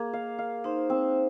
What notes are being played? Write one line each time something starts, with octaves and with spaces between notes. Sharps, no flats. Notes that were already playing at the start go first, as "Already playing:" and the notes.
Already playing: A#3 G#4
F5
F5
D#4 C5
C4